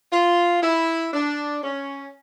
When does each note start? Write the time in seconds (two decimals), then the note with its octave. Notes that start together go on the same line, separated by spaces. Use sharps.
0.12 F4
0.63 E4
1.14 D4
1.63 C#4